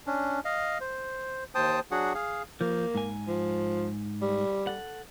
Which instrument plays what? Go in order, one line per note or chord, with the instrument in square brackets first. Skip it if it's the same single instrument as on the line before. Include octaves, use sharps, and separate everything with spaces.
[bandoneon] C#4 D4
D#5 F5
C5
D#2 C5 G5 A5 D#6
F#3 D4 F#4 G#4 F#5
G#4 F5
[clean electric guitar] F3 [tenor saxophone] A#3
[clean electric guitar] G#2 G#5
[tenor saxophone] F3
G3
[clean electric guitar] A4 F#5